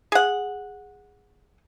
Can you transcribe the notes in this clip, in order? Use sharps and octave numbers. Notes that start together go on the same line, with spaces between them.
G#4 F#5